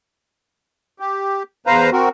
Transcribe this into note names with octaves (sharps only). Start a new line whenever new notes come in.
G4
E2 B4 C5 F5 A#5
C4 F#4 A#4